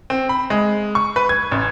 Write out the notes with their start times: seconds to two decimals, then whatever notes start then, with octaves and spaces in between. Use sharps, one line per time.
0.10 C4
0.29 B5
0.50 G#3
0.95 C#6
1.16 B4
1.29 G#6
1.51 A1